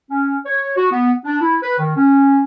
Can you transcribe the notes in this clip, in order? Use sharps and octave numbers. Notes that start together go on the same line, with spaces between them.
C#4
C#5
F#4
B3
D4
E4
B4
D#3
C#4